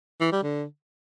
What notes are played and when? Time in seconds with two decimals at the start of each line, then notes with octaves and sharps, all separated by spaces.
0.20 E3
0.32 G3
0.43 D3